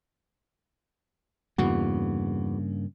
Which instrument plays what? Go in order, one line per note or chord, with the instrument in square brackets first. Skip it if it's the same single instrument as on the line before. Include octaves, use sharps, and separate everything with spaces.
[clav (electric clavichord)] E2 F#4 [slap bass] G2 C#3 A#3